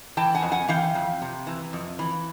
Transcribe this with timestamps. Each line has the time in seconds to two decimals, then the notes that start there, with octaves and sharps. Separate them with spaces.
0.17 E3 G5 A5
0.35 F#5 G#5
0.43 F2
0.51 F#5 G#5
0.68 E3 F5 G5
0.95 F2
1.22 C3
1.47 E3
1.73 F2
1.99 E3